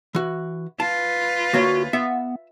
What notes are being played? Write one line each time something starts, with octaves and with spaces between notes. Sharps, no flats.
E3 F#4
F4 B4 A5
D2 A#3 F#4 C#5
B3 E5